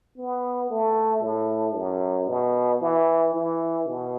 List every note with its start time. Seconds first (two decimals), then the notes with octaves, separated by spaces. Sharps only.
0.18 B3
0.71 A3
1.23 A2
1.76 F#2
2.29 B2
2.81 E3
3.34 E3
3.88 B2